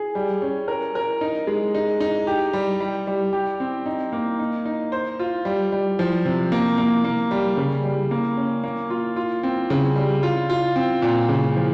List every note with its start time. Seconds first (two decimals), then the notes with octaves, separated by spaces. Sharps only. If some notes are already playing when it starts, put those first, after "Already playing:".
Already playing: G#4
0.15 G3
0.42 C#4
0.68 A#4
0.95 A#4
1.21 D#4
1.47 G#3
1.75 D#4
2.00 D#4
2.27 G4
2.53 G3
2.80 G3
3.07 G3
3.33 G4
3.60 C4
3.86 D#4
4.12 A#3
4.39 D#4
4.65 D#4
4.92 C5
5.19 F4
5.45 G3
5.72 G3
5.99 F3
6.25 C3
6.52 A#3
6.78 A#3
7.04 A#3
7.31 G3
7.57 C#3
7.84 G3
8.11 A#3
8.37 C#4
8.64 A#3
8.90 F4
9.16 F4
9.43 C4
9.70 C#3
9.96 G3
10.23 F4
10.50 F4
10.76 C4
11.02 A#2
11.29 C#3
11.56 F3